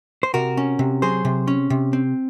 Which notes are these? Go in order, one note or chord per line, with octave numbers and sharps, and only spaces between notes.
C5
C3 F#4 A#4
C#4
C3
F#3 G#4 C5
C3
C#4
C3
C4